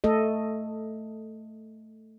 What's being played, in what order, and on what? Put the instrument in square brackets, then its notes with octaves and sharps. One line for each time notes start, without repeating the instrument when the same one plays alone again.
[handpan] A3 A4 D#5